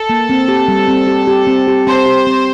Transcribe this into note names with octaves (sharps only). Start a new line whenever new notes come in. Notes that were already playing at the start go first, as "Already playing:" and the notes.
Already playing: A4
A#3
C4
G4
G3
C4
G4
G4
C4
G4
C4 C5
G4
C4